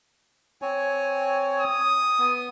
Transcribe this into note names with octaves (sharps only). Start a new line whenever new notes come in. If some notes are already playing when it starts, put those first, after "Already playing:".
C4 C#5 G#5
D#6
B3